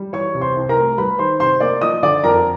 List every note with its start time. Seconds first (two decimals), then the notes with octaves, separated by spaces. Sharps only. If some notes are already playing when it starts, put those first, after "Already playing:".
Already playing: G3
0.13 E3 C#5 C#6
0.35 C3
0.41 C5 C6
0.56 C2
0.69 A#4 A#5
0.76 A3
0.97 G3 B4 B5
1.18 D#3 C5 C6
1.40 C3 C5 C6
1.60 A#3 D5 D6
1.81 F3 D#5 D#6
2.03 D3 D5 D6
2.24 F2 A#4 A#5